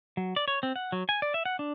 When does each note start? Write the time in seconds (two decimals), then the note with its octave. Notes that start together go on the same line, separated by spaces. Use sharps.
0.17 F#3
0.36 D5
0.48 C#5
0.63 C4
0.76 F#5
0.92 F#3
1.09 G#5
1.22 D5
1.34 E5
1.45 F#5
1.59 D4